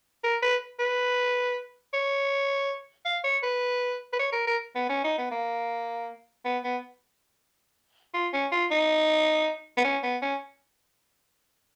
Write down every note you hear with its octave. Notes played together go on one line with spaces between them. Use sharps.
A#4
B4
B4
C#5
F5
C#5
B4
B4
C#5
A#4
A#4
B3
C#4
D#4
B3
A#3
B3
B3
F4
C#4
F4
D#4
B3
C#4
B3
C#4